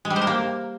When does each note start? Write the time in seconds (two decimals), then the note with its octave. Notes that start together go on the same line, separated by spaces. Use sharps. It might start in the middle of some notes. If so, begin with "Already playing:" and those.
0.05 G#3
0.10 G3
0.16 C5
0.22 A#4
0.27 A#3